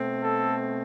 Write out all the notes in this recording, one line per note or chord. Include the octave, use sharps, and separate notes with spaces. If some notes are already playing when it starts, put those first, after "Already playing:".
Already playing: B2 A3 C4
A4